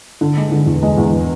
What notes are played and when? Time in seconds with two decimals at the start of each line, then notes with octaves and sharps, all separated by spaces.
0.21 D3
0.37 G#3
0.52 D3
0.66 E2
0.83 G#3
0.98 E2